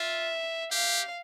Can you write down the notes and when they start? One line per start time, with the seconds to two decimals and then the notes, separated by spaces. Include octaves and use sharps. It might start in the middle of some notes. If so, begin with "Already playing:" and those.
Already playing: F4 E5
0.71 G4 F5